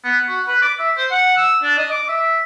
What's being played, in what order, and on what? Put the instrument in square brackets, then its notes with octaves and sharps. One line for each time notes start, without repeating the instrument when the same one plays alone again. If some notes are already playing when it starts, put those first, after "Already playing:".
[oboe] B3
F#4
B4
D6
E5
C5
F#5
E6
D4
D#5
D6
E5